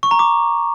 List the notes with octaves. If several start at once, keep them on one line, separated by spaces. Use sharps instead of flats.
C#6
A#5
D6